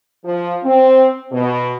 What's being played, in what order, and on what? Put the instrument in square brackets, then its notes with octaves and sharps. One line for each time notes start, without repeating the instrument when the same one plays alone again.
[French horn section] F3
C4
B2